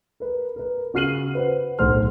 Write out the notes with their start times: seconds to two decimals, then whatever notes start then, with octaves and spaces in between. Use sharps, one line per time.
0.20 A#4 B4
0.56 A#4 B4
0.94 C#3 F#4 F6 C7 D#7 F#7
1.35 B4 C5 F#5
1.79 D1 B1 C5 F#5 C6 F6